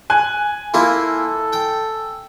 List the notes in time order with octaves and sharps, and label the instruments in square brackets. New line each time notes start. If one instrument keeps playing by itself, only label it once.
[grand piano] G#5 F#6
[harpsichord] A#3 E4 F4 [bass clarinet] A4
[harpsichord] G5